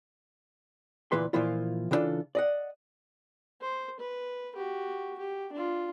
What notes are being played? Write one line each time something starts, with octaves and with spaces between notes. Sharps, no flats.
D2 A#2 E3 B4 C6
A#2 E3 F3 A#3 E4 F4
C#3 E3 B3 D4 F4 A4
D5 D#5 F#5
C5
B4
F#4 G4
G4
D4 F4